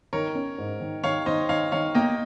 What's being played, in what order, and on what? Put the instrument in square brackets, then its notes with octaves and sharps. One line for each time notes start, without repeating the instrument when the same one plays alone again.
[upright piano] D#3 [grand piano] A#4 C#5
[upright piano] C#4
G#2
D#3
[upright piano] D#3 [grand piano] C#5 F5
[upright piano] D#3 [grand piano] C5 D#5
[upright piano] D#3 [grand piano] C#5 F5
[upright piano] D#3 [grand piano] C#5 F5
[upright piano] A#3 [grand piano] D#5 G5